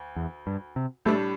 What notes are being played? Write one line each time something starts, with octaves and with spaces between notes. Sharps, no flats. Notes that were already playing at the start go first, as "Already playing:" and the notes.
Already playing: D2
E2
G2
C3
A2 G3 A3 D4